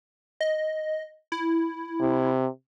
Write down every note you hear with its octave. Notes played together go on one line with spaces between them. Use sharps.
D#5
E4
C3